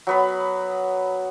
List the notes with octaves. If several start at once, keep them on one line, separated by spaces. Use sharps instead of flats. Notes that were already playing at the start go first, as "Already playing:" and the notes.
F#3 B3 B5